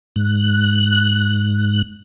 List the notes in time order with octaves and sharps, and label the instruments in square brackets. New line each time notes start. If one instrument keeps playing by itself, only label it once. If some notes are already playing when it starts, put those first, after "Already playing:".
[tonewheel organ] G#2 F#6